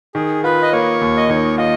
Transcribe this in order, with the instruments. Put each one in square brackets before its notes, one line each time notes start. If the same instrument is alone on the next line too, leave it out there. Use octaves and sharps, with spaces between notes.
[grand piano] D#3 [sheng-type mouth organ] G#4
[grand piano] F4 [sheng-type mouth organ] B4
[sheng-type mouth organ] D#5
[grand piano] A#3 [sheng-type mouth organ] C#5
[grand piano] D#2
[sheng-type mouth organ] D#5
[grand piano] D#3 [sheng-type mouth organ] C#5
[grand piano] F4 [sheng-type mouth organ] D#5